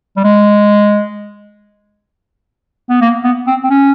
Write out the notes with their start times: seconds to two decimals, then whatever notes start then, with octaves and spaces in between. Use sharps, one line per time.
0.17 G3
0.24 G#3
2.90 B3
3.01 A#3
3.24 B3
3.47 C4
3.64 C4
3.70 C#4